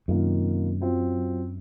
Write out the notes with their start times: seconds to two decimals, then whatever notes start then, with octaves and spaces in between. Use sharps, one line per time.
0.08 F#2 C3 D#3 A#3 F4
0.81 F#3 C4 F4